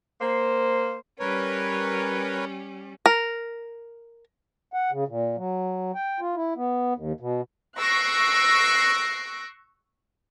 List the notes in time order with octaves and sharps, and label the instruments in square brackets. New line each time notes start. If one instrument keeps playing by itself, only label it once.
[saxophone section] A#3 C5
[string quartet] G3 C#4 [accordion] A#4 B4 C#5
[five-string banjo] A#4
[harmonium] F#5
C#3
A#2
F#3
G5
F4
E4
B3
D#2
B2
[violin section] C#6 E6 F#6 A#6 C7 D7